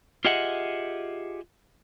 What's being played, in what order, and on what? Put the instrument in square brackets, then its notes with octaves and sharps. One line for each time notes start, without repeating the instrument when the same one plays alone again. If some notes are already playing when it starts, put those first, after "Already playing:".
[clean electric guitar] F4 G4 G#4 D#5 E5 F#5